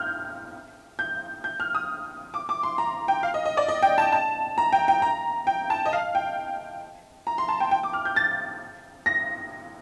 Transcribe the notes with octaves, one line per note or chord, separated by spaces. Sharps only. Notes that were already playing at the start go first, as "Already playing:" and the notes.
Already playing: F6 G6
G6
G6
F6
D#6
D6
D6
C6
A#5
G5
F5
D#5
D#5
D5
D#5
G5
A5
A5
A#5
G5
G5
A#5
G5
A5
D#5
F5
G5
A#5
C6
A5
G5
G5
D6
F6
G6
A6
A#6